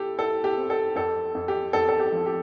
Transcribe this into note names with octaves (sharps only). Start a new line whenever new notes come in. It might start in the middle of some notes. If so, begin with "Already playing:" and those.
Already playing: E4 G4 A4
E4 A4
G4
C4
A4
F2 A4
F2
G4
F2 A4
A4
G4
F3
G4